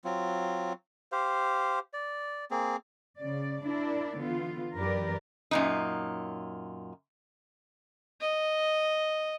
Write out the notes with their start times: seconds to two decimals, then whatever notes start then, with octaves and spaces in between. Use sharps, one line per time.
0.04 F#3 C4 F4
1.12 G4 C5 F5
1.93 D5
2.51 A#3 C4 G#4
3.17 C#3 D5
3.65 D4 E4 A#4 D5
4.18 D3 E3 B3 F4
4.75 F#2 E3 G4 A#4 B4 D5
5.51 F#2 A#2 D#4
8.20 D#5